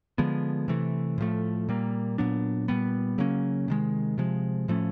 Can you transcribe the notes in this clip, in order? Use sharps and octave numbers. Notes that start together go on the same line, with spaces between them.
D3 F3 G#3 B3
C3 E3 A3
A2 F3 A3
A#2 G3 A#3
A#2 F#3 B3 D4
A#2 G3 B3
C#3 F#3 A#3 C#4
C3 D#3 G#3
C3 F3 G#3
A2 F3 A3 C#4